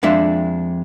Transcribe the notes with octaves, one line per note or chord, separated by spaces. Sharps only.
F2 G#3 D4 E5